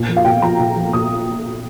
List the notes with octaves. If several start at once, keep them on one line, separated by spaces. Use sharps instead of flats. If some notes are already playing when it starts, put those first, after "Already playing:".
Already playing: A#2
F3
F5
A#2 G5
F3 A#5
A#2
F3
A#2 D#6